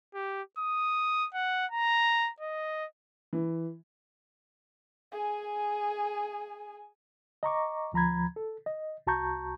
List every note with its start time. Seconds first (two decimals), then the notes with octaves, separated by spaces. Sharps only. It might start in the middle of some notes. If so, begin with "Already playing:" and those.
0.15 G4
0.58 D#6
1.34 F#5
1.71 A#5
2.40 D#5
3.33 E3
5.12 G#4 G#5
7.43 D#5 A#5 C#6 D6
7.93 D2 F3 A#5 B5 G#6
8.36 A4
8.66 D#5
9.07 C2 F#4 A5 A#5 C#6 G6